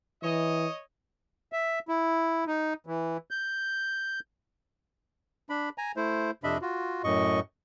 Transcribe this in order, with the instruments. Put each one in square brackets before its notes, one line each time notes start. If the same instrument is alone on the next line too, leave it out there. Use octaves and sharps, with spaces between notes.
[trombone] E3 [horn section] C#5 D#5
[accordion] E5
E4
D#4
E3
G6
[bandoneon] D4 B5
G#5 A#5
A3 E4 C5
F2 C3 D4 D#5 E5 B5
F4 F#4
F#2 A2 D#5 C#6